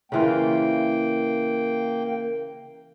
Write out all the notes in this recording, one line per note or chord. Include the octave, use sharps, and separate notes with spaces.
C#3 E3 A#3 F4 G5